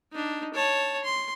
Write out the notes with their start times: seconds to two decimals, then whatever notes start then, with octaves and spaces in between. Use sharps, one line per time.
0.12 D4 D#4
0.54 C#5 A5
1.04 C6